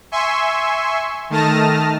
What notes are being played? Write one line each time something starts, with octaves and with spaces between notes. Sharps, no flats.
E5 G#5 C6 C#6
D#3 A3 A5 D#6 F6 A#6